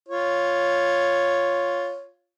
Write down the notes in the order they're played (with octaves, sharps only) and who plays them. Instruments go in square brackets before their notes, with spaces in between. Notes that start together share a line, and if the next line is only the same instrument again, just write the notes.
[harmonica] F4 C#5